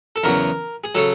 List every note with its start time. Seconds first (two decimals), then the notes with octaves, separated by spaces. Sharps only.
0.16 A4
0.24 E2 C#3 F#3 A#4
0.84 G#4
0.95 C#3 F#3 A4